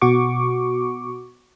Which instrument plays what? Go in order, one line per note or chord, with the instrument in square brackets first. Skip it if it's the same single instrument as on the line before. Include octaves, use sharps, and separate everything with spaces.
[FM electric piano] B2 F#4 C#6 D6